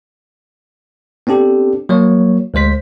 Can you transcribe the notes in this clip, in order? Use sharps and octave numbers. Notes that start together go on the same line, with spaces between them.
B3 C4 D4 G4 A4
F#3 A#3 C#5
D2 G#3 C5 B6